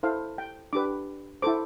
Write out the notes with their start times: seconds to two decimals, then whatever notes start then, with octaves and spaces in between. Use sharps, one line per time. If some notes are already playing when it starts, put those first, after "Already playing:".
0.03 E4 A4 C5 F5
0.38 G5
0.73 D4 G4 B4 D6
1.42 E4 A4 C5 D6